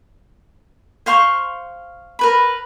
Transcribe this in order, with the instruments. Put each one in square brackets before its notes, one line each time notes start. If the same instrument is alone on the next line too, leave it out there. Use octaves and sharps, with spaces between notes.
[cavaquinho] C5 F5 C6 C#6
A#4 B4 B5